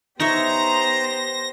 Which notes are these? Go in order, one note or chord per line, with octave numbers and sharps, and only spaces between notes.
B3 D#4 G4 C5 C#5 E5 A#5 A#6